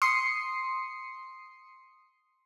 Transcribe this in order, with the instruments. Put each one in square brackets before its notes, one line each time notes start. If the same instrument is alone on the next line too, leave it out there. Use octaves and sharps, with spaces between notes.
[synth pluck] C6 D#6 C7 C#7